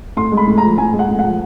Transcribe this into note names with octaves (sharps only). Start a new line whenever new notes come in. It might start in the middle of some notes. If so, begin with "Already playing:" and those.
A2 C6
G#3
B5
A2
A#5
F3
A2 G#5
G#3
F#5
A2
F#5
F3